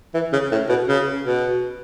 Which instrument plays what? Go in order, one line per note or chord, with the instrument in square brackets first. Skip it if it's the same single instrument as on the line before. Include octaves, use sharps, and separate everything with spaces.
[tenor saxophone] E3
C#3
A2
B2
C#3
B2